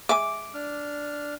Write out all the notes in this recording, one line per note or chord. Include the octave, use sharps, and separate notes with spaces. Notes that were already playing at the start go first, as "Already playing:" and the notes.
G#3 E5 G#5 D6
D4 F6